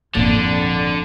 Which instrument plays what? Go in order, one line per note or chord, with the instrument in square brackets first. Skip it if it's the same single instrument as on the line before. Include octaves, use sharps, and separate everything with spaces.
[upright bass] G#1 F4 [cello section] F2 D4 [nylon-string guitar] A#2 [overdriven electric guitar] D3